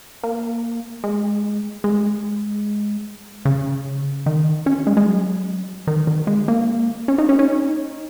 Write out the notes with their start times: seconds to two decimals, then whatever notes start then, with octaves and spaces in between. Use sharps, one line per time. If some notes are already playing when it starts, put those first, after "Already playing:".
0.23 A#3
1.04 G#3
1.84 G#3
3.45 C#3
4.26 D#3
4.66 C#4
4.87 G#3
4.97 G#3
5.06 F#3
5.87 D#3
6.07 D#3
6.27 G#3
6.48 A#3
7.08 C#4
7.18 D#4
7.29 C#4
7.39 C#4
7.48 D#4